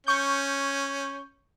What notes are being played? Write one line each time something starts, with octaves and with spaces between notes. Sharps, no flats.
C#4 C#6 G6